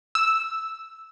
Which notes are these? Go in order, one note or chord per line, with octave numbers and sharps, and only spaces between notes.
E6